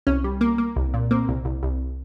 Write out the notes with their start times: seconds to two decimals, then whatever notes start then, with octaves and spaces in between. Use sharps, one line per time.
0.07 C2 C#4
0.24 G3
0.41 A#3
0.58 A#3
0.76 C2
0.94 A#2
1.11 A#3 C4
1.29 C2
1.45 C2
1.63 C2